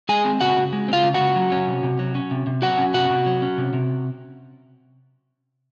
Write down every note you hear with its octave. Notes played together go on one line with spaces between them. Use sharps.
G#3 G#4 G#5
C4
C#3 F#4 F#5
C#3
G#3
C4
F4 F5
C#3
F#4 F#5
C#3
F#3
C#4
C3
C3
F#3
C#4
C3
C3
F#3 F#4 F#5
C#4
C3 F#4 F#5
C3
F#3
C#4
C3
C3